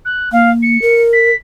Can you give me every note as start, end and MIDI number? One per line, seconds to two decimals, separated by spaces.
0.05 0.29 90
0.32 0.78 58
0.32 0.51 77
0.63 1.02 97
0.82 1.31 70
1.13 1.35 95